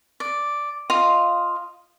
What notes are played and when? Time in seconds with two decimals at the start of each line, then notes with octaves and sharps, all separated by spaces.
0.20 D5
0.90 F4 D#5 F5 D#6